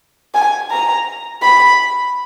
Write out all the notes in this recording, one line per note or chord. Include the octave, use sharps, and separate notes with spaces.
G#5
A#5
B5